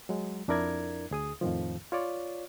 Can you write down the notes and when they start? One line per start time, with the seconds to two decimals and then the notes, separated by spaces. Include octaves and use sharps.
0.09 F#3 G#3
0.48 F2 D4 E4 A#4 D5 G#6
1.11 D2 G#4 D#6
1.41 F2 A2 D#3 F3
1.92 F4 C#5 D5